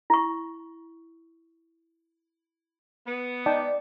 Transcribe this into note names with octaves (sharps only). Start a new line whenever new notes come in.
E4 C#6
B3
D#4 D5 G5 A5